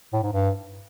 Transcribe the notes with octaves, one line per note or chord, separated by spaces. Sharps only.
A2
G#2
G2